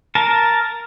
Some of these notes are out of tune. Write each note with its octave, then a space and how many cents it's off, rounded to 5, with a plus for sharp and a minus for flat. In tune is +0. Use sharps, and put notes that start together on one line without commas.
A#4 +0 A5 +0